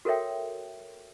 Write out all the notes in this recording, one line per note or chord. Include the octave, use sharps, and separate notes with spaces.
F#4 A4 A#4 C#5 E5 G5